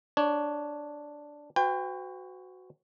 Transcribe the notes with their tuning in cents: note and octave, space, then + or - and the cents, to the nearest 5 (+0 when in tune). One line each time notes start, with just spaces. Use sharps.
D4 +0 C#5 +15
F#4 +0 B4 +45 G5 +30